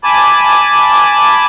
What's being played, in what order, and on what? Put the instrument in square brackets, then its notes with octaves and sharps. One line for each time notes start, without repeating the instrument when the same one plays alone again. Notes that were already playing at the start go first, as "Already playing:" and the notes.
[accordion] G#5 A5 B5 D6